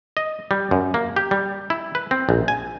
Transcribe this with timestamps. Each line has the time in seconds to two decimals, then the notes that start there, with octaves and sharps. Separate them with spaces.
0.17 D#5
0.51 G3
0.71 F#2
0.94 A#3
1.16 G4
1.31 G3
1.70 E4
1.95 B4
2.11 C4
2.29 A#1
2.48 G#5